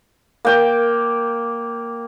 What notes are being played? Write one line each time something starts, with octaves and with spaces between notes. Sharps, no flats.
A#3 G5 D6